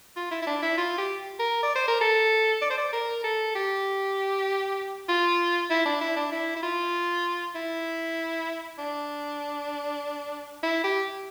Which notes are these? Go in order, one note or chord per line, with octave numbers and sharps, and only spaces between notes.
F4
E4
E4
D4
E4
F4
G4
A#4
D5
C5
A#4
A4
D5
C5
D5
A#4
A4
G4
F4
E4
D4
E4
D4
E4
E4
F4
E4
D4
E4
G4